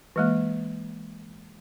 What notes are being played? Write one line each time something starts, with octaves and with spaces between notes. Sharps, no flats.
E3 G#3 A#3